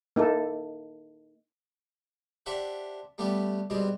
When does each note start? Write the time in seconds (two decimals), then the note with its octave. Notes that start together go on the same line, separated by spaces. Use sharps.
0.16 A#3 D#4 E4 A4
2.46 D4 G4 C5 E5 F#5
3.18 G3 A3 B3 G4
3.70 B2 G3 G#3 C4